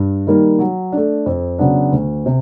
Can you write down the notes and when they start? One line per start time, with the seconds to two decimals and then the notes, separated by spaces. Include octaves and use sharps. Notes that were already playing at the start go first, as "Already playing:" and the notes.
Already playing: G2
0.27 D#3 G3 A#3
0.59 F#3
0.92 A3 D4
1.26 F2
1.59 C#3 F#3 B3 D4
1.92 D2
2.26 C3